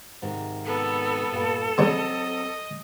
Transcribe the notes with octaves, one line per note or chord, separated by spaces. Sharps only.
G#2 C3 D#3
B3 A4
G2 A#2 G5
C#3 F#3 G3 B3 C4 D#5